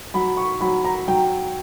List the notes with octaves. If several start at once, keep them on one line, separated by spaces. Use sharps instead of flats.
F#3 B5
C#6
F#3 B5
A#5
F#3 G5